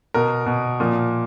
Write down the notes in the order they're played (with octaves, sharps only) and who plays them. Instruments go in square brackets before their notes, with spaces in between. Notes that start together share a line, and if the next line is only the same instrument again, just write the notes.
[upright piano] B2 A#4
B2
A#2 F3